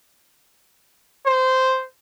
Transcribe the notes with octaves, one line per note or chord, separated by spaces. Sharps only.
C5